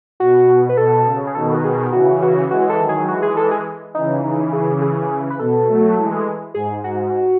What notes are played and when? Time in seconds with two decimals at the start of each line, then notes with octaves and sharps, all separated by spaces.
0.20 B2 F#4
0.69 B4
0.77 B2 A4
1.06 C#3
1.27 G#4
1.35 B2 D#3 A4
1.55 F#4
1.64 G#4
1.92 C#3 E3 F#4
2.22 F#4
2.51 E3 G#3 F#4
2.69 A4
2.79 D#3 F#3
2.89 G#4
3.08 E3 G#3 F#4
3.22 G#4
3.37 A4
3.51 G#4
3.95 C#3 E3 D#4
4.23 C#3 E3 D#4
4.53 G#4
4.81 G#4
5.30 B4
5.39 B2 A4
5.68 F#3 A3
5.97 E3 G#3
6.54 G#2 G#4
6.84 G#2 F#4